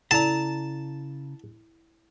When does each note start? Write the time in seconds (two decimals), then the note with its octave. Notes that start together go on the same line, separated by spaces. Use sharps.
0.11 C#3 E4 A4 D5 A5 A#5